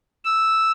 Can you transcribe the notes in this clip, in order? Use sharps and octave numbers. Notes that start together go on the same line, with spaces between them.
E6